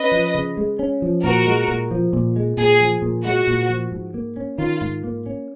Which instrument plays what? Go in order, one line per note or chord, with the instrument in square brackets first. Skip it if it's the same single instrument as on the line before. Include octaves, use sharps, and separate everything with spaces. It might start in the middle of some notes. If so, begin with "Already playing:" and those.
Already playing: [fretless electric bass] C#4 [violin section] B4 D#5
[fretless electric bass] F3
C#3
G#3
C#4
F3
[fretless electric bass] A#2 [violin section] F#4 A#4
[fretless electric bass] G#3
A#2
F3
A#2
G#3
[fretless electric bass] A#2 [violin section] G#4
[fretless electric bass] F3
A#2
[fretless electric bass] G#3 [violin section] F#4
[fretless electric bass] A#2
F3
G#2
A#3
C#4
[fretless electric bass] D#3 [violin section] F4
[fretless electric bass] G#2
A#3
C#4